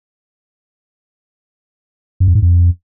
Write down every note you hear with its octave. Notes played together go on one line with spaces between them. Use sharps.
F#2
F2
G#2
F2